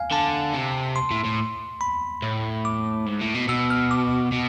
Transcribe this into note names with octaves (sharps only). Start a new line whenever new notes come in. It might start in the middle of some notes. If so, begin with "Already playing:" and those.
Already playing: F5 G#5
D3 A5
C3
C6
A2
A2
B5
A2
D6
G#2
A2
B2
B2 E6
F6
D6
B2